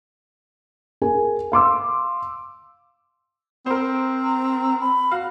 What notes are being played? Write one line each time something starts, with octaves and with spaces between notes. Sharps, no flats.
G#4 A#4 G#5
F5 C6 D6 E6
C4 A#4 C5
A#5
B5
F#4 F5